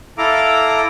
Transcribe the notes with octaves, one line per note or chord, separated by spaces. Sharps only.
E4 A4 F5 A#5 D6